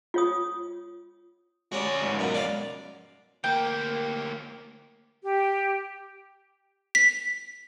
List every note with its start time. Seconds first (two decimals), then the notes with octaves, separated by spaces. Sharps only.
0.14 F4 C#5 D#6
1.72 G#3 C#4 F#4 D5
2.02 C#2 G#2
2.19 F#2 B2
2.35 D5 F5
3.44 D2 A#3 G5
5.23 G4
6.95 B6